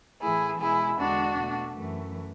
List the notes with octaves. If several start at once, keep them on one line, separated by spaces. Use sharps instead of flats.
A2 E3 A3 E4 G#4
B2 G#3 E4 G#4
E2 D3 G#3 D4 F#4
B2 A3
F#2 E3 A3